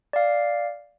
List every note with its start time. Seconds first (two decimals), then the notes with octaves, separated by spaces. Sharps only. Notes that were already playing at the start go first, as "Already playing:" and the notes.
0.13 D5 F5